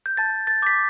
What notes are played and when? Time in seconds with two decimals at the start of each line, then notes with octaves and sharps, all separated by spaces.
0.06 G6
0.17 A5 A6
0.47 A6
0.62 D6 G6 B6